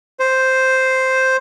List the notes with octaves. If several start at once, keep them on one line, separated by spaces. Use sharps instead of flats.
C5